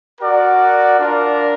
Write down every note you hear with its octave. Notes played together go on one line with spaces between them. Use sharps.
F#4 A#4 D5
D4 F4 A#4 D5